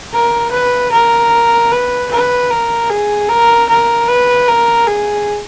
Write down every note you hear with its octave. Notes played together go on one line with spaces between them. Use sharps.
A#4
B4
A#4
B4
B4
A#4
G#4
A#4
A#4
B4
A#4
G#4